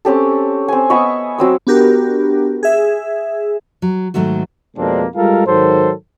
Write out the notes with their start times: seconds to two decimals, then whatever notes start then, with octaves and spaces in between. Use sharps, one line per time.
0.05 C4 C#4 G4 A4
0.68 C4 G#5
0.90 B3 D#5 E5 C#6
1.38 F#3 C4 E6
1.67 B3 D4 F#4 G4 A#4
2.63 G#4 E5
3.82 F#3
4.14 G#2 D#3 F#3 A3 F#4
4.77 F2 B2 G#3 A#3 C4 D4
5.16 G3 G#3 F4 A4 A#4 F5
5.47 G#2 D#3 F#3 A4 C5